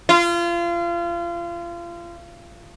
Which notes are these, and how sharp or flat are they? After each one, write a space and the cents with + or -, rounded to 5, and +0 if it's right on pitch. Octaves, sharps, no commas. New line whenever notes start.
F4 -30